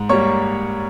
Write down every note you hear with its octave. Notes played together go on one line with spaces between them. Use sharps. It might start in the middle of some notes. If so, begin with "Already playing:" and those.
Already playing: G#2
G3 A#3 C#5 C#6